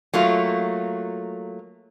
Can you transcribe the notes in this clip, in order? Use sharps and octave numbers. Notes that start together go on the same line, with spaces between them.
F#3 A3 A#3 F4